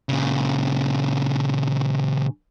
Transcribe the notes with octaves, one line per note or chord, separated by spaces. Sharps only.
A#2 C#3